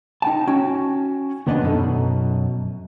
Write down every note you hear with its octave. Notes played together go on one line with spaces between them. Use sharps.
D#4 G5 A5
C#4 F#4 G5
D#2 C#3 B3 D4 B4 D#5
F#2 B2 D#4 A4